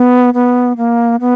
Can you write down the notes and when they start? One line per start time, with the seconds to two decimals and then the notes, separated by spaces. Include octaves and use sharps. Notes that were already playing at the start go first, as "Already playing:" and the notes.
Already playing: B3
0.34 B3
0.77 A#3
1.21 B3